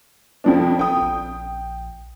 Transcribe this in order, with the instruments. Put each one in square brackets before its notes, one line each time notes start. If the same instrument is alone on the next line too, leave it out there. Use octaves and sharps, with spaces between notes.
[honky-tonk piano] F2 F3 D4
[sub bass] F1 [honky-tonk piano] G5 D#6
[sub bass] A#1